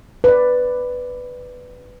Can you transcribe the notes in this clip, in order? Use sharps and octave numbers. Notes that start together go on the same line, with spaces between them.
B4 D5